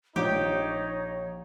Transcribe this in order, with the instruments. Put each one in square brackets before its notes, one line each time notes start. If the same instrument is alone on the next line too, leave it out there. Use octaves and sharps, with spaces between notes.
[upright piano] A#1 [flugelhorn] D#4 [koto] G4 [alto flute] C#5